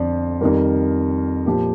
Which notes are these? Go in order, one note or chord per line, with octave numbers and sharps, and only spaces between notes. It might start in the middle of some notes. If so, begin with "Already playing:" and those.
Already playing: F2 D3 F3 D5
F2 D#3 G3 A#4
A#2 F3 G4